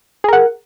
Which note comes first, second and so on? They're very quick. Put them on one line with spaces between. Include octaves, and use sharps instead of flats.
G#4 A#4 F#5